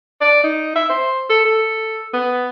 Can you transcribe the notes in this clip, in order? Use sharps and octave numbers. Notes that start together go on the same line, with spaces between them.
D5
D#4
E5
C5
A4
A4
B3